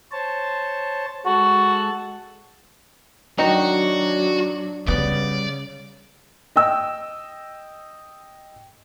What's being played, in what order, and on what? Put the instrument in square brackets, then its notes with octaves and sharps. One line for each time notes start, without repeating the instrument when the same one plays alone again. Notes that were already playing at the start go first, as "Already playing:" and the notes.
[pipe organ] C5 C#5 A5
[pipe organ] G#3 A4 A5 [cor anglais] F#4
[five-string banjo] D#3 D#4 [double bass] F#3 D4 [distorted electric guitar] F#4
[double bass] C#3 [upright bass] G3 [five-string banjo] B3 [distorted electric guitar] D5
[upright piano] D#5 G5 E6